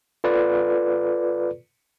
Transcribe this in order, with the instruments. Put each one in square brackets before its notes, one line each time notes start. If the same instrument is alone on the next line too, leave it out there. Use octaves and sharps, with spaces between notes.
[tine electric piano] F4 A4 B4 D5